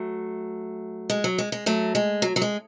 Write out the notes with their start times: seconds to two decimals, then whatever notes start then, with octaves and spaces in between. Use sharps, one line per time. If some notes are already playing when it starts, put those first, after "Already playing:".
Already playing: F#3 A3
1.10 G#3
1.24 F#3
1.38 G#3
1.52 G#3
1.66 F#3 A3
1.95 G#3
2.22 F#3
2.36 F#3
2.42 G#3